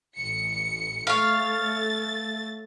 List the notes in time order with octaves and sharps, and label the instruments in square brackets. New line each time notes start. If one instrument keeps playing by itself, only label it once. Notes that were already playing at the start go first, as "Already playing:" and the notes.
[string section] A1 C#7
[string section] A3 A6 [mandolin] C#5 F5